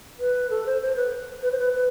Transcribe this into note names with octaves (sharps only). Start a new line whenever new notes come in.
B4
A4
C5
C5
B4
B4
C5
B4
B4